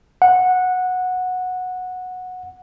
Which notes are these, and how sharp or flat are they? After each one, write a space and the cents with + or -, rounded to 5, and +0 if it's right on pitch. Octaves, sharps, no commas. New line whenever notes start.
F#5 -15